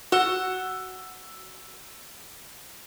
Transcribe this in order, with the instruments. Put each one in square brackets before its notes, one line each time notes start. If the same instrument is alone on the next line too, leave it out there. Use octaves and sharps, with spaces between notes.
[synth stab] F#4 [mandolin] F#5 [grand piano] E6 E7 G7